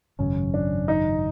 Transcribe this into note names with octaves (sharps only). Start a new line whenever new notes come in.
G#1 F#2 C#3 F#3 C#4
D4
D#4